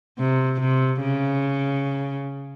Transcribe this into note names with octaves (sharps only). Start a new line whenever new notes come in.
C3
C3
C#3